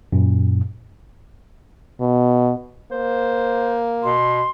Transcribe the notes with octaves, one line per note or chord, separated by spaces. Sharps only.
F#2 A#2
B2
A#3 C5
B2 C6